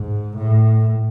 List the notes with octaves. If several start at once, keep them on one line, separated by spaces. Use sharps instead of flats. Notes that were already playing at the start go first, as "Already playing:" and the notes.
Already playing: G#2
A2